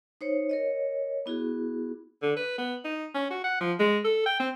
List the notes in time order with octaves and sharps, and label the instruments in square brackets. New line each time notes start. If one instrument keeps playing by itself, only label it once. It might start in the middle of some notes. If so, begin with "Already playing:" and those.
[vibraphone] D#4 C5 C#5
A#4 C#5 D#5
B3 E4 F#4 G#4
[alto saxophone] D3
B4
B3
D#4
C#4
F#4
F#5
F3
G#3
A4
G5
C4